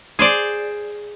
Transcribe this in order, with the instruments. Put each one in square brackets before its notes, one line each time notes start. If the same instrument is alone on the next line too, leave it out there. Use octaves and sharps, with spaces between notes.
[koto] G#4 C5 D5